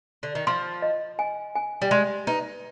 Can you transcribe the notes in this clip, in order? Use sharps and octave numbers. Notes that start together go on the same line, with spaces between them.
D3
D#3
F3 C6
D#5
G#5
G#5
G3
G#3 C6
D#4 B4